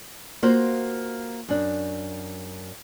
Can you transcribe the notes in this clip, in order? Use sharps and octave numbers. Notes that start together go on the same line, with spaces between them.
A#3 F4 F#4 C5
F#2 D4